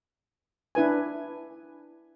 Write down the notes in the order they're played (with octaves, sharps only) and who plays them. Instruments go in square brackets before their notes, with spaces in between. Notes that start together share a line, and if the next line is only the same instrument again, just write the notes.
[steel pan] D4 E4 B4 G#5